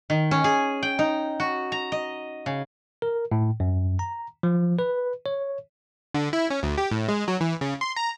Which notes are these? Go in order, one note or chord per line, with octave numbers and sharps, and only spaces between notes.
D#3
C#4
G#4
G5
D#4
F#4
A#5
D#5
C#3
A#4
A2
F#2
A#5
F3
B4
C#5
D3
E4
C#4
D2
G4
A2
G#3
F#3
E3
C#3
C6
A#5